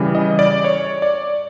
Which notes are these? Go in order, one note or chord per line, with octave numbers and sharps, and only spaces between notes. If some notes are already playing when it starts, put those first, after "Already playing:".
Already playing: C#3 E3 G3
D#5
D5
C#5
D5